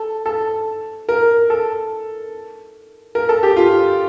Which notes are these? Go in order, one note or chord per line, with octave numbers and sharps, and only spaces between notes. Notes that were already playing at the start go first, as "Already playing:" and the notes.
Already playing: A4
A4
A#4
A4
A#4
A4
G4
F4